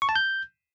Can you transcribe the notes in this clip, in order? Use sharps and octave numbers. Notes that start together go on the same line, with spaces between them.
C#6
A5
G6